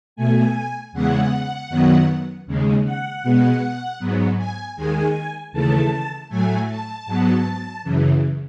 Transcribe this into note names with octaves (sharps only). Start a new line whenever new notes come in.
B2 A3 G#5
E2 C#3 E3 G#3 B3 F#5
F#2 D#3 F#3 B3
D#2 C#3 G#3
F#5
B2 G#3 B3
G#2 F#3 B3
G#5
D#2 D#3 G#3 G#5
D#2 C#3 E3 A3 A5
A2 F#3 A3 G#5
A5
G#2 F#3 B3
F#2 C#3 E3